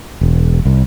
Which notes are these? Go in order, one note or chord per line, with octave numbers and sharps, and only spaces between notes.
E1
C2